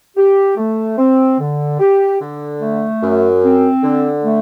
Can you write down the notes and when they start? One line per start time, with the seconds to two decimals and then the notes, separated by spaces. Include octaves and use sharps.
0.17 G4
0.57 A3
0.98 C4
1.39 D3
1.80 G4
2.20 D3
2.60 A3
3.02 F#2
3.42 C4
3.83 D3
4.23 A3